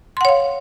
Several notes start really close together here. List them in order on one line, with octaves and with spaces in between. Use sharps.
C6 F#5 C#5 F5